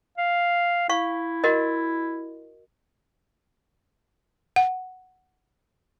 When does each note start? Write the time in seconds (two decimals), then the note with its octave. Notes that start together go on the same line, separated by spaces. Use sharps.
0.18 F5
0.89 E4 F5 C#6
1.44 F#4 A#4 D#5
4.56 F#5